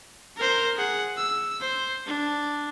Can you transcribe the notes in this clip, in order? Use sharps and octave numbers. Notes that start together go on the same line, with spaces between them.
A#4 C5
G#4 F#5
E6
C5
D4